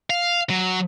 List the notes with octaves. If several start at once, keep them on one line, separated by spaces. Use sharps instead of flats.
F5
F#3